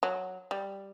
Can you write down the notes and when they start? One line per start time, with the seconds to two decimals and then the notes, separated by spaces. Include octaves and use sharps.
0.03 F#3
0.51 G3